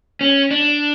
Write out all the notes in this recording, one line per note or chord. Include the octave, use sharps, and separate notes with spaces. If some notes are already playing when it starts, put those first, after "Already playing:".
C#4
D4